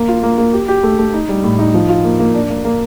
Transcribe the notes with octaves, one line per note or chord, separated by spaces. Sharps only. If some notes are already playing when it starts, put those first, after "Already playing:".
Already playing: A#3
F4
A#3
A#3
G4
G4
A3
A3
D#4
G3
A2
D#4
F3
F4
A#3
A#3
D4
A#3
A#3